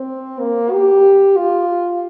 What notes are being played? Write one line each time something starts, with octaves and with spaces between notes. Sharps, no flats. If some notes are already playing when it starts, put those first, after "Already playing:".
Already playing: C4
A#3
G4
F4